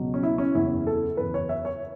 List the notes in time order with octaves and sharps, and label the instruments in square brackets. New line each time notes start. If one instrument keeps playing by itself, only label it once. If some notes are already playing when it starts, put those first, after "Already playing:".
Already playing: [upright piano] C#2 B2 F#3
C#4
E4
C#4
F#1 E2 E3 E4
A4
F#1 E2 E3 B4
C#5
E5
C#5